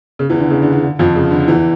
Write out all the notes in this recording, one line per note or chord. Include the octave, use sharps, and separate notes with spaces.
C#3
E2 E3
D3
C#3
D3
D3
D3
F2 F3
C#3
D3
E2 E3